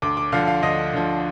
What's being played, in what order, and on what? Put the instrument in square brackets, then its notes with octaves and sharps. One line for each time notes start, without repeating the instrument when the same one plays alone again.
[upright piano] D2 D6
D6
D3 F3 F5
F5
D2 D#5
D3 F3